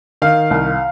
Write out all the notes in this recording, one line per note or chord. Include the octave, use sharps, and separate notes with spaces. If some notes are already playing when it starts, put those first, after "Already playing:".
D#3 F5
C2